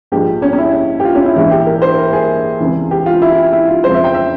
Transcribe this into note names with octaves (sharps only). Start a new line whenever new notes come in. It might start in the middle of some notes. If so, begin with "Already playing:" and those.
A#1 G#2 F3 G#3 G4
C#4
C#4
E4
G4
F4
C#4
E4
A#1 G#2 E3 E4
G4
A#4
C5
A#4
G#4
C#2 C3 E3
G4
F4
E4
E4
E4
F4
F2 C#3 F3 G#3 C5
E5
G5
E5